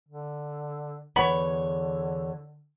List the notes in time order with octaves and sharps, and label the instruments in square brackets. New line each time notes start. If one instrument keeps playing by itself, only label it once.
[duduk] D3
[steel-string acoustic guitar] E2 C#5 [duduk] D3 [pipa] B3 B5